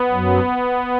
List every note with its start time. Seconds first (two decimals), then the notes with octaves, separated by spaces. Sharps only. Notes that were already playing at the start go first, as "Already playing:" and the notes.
Already playing: B3
0.11 F#2 F#3